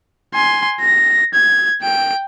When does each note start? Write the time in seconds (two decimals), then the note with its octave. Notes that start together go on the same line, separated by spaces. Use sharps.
0.34 G#5 C6
0.80 A#6
1.33 G#6
1.81 G5 D7